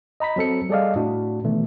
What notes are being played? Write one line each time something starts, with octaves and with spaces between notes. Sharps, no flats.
D#5 A#5 B5 B6
F#3 C4 A4 C#7
G3 G#4 A4 D5 D#5 F5
A2 D4 F#4
B2 D#3 E3 A3